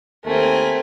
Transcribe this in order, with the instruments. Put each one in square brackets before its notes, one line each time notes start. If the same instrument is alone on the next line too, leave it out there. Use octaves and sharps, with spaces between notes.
[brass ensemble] D#2 A#4 G#5 [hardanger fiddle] A3 C4